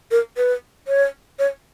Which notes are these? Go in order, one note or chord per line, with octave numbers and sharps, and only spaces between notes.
A#4
B4
C#5
C#5